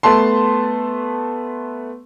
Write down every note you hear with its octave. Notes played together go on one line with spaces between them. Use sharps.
A3 B3 A5 C6